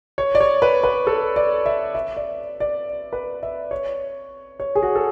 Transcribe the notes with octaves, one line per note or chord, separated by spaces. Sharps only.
C#5
D5
C#5
B4
B4
A4
D5
E5
E5
D5
D5
B4
E5
C#5
C#5
G#4
F#4
A4